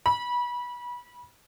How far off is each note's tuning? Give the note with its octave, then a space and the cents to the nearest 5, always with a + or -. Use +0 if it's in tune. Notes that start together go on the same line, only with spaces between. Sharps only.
B5 -25